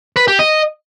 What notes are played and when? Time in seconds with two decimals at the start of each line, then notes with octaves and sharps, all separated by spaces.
0.16 B4
0.28 G4
0.39 D#5